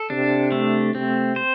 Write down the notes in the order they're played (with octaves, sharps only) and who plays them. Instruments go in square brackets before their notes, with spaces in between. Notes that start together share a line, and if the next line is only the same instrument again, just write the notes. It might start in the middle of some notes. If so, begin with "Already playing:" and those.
Already playing: [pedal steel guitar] A4
[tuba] C3 [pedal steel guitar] D4
[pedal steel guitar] A3
[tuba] C3 [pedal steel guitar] C4
[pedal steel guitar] C5